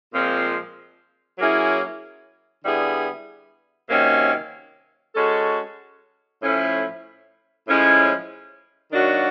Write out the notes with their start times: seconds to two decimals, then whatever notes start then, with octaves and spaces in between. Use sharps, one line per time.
0.12 A#2 F3 G#3 C4
1.38 F#3 A#3 C#4 E4 G#4
2.63 D3 G3 B3 E4 G#4
3.89 C3 D#3 F#3 A#3 C#4
5.15 G#3 C#4 F#4 A4
6.41 A2 F3 A3 C#4 E4
7.66 A2 F3 G#3 C#4 E4
8.92 D#3 F#3 A#3 D4 F#4